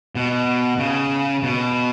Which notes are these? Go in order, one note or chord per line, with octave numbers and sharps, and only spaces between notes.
B2
C#3
B2